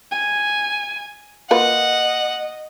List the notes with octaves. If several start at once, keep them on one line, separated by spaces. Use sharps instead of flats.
G#5
A#3 F4 B4 D#5 F#5